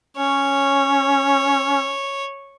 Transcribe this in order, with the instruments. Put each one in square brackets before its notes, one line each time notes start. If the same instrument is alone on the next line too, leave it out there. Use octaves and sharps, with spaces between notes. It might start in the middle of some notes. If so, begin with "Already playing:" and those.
[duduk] C#4 [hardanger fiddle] C#5